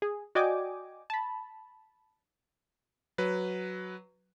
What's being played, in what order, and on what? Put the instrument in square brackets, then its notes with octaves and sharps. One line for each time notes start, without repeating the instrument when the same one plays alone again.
[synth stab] G#4
F#4 D5 D#5 G5 G#5 D6
A5 B5
[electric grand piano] F#3 B4